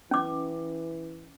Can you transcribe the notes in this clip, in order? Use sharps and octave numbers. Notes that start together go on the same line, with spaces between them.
E3 C#4 D6